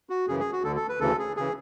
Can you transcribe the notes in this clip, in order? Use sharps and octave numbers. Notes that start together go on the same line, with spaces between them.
F#4
F#2 C#3 E3 G#4
G#4
F#4
D2 D3 A4
A4
B4
D2 C#3 E3 A4
G#4
C#3 E3 G#4